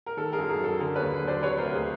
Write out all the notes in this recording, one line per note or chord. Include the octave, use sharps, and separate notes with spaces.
A#4
D#3 A4
G#4 A#4
F#2
G#4 A#4
F#3
A4
D3 G#4 A#4
B4 C#5
D#2
F#3
C5 D5
C3 B4 C#5
A#4 C5
D2
G#4